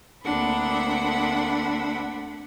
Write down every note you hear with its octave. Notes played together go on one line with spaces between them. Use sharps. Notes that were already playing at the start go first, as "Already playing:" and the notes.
D2 A#3 C4 D4 F#5 B5